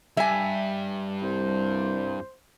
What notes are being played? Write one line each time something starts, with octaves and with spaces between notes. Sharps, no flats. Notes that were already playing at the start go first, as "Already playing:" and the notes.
G2 E5 G#5
C2 C5